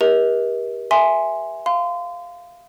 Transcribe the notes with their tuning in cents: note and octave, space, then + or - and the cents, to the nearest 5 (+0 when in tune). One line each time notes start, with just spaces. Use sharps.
G4 +10 A#4 +35 D#5 +45
E5 +0 G#5 +0 C6 +0
F5 +0 C6 -30